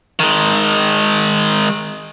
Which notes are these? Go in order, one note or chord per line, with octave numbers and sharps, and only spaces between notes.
D#3 G#3